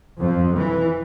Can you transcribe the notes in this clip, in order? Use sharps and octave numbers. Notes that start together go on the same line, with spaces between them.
F2
E3